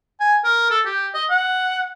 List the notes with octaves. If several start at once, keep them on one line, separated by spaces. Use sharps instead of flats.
G#5
A#4
A4
G4
D#5
F#5